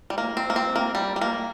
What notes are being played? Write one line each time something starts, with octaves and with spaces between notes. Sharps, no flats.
G3
A#3
C4
A#3
C4
A#3
G3
G3
A#3